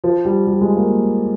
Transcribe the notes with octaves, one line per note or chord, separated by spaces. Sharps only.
F3
G3
G3
G#3
A#3